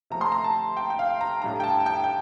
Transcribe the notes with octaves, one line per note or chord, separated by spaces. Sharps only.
C3 F3 A3 A#5
C6
A#5
A5
G5
G5
F5
A#5
A2 G3 D4 A#5
G5
A5
A5
G5
G5